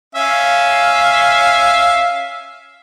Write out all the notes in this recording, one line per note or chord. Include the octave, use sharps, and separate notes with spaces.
C#4 E5 F5